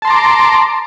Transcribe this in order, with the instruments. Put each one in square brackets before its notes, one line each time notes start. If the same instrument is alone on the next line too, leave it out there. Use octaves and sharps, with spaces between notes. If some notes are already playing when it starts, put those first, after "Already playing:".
[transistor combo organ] A5
C6
A#5
D6